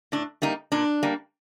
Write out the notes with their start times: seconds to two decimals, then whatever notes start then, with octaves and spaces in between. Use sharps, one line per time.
0.12 A2 D4
0.42 G3 A#3 D#4
0.72 A#2 D4
1.03 G3 A#3